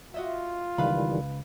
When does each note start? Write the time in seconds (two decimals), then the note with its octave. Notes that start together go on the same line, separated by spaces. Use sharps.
0.14 F4 F#4 D#5 E5
0.78 C#2 D#3 E3 G3 B4 F5 B5